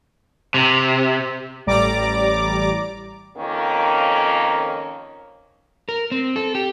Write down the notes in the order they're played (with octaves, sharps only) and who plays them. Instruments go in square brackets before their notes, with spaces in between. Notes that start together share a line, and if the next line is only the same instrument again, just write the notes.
[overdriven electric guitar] C3
[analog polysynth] A1 G3 D5 A#5 D6
[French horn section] F2 D#3 A#3 C#4
[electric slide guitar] A#4
C4
A4
G4